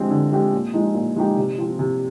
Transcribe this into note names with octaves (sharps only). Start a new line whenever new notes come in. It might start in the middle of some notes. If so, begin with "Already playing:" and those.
Already playing: D3 F3 G#3 C4 G4
D3
F3 G#3 C4 G4
A#2
F3 G#3 D#4 G4
A#2
F3 G#3 D#4 G4
C3
F3 C4
C3